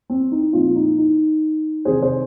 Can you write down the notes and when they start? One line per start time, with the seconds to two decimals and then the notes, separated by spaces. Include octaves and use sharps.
0.10 C4
0.32 D#4
0.53 A#2 F3 A#3 C4 F4
0.75 D#4
0.98 D#4
1.85 C3 D#3 C4 G#4 C5
2.02 G#4 C5